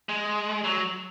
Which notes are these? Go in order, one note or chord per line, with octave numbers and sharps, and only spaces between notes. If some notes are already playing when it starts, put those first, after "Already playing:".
G#3
F#3